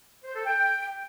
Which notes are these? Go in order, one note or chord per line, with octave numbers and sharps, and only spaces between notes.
C5
A4
G5